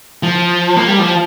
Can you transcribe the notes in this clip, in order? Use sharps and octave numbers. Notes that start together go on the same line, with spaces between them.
F3
A#3
G3
F3